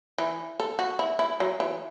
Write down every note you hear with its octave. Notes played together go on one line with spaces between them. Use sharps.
E3
A4
F#4
E4
E4
F#3
E3